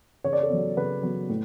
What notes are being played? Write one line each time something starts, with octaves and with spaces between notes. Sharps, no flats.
C#3 C#5
D5
A4 C#5
F#3 B3
C#3 B4
F#3 B3
A2